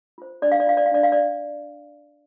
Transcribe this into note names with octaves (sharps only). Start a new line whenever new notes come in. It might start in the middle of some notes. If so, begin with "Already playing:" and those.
F4 C5
D4 D5
F5
D5
F4 C5 F5
D5
F5
D4 D5
F5
D5